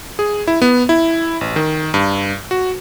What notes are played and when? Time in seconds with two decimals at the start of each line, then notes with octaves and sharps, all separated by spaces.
0.19 G#4
0.48 E4
0.62 B3
0.89 E4
1.41 A1
1.56 D#3
1.94 G2
2.51 F#4